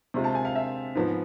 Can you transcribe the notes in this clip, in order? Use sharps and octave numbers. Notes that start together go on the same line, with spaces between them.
C3 G#3 C4 F4
A5
G#5
F5
E5
G#2 F3 B3